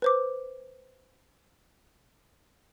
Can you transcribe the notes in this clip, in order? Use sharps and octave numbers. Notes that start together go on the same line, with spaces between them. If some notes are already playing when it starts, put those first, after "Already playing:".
B4 C5 D6